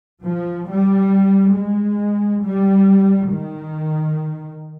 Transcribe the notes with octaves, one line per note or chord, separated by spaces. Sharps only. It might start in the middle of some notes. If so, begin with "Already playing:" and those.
F3
G3
G#3
G3
D#3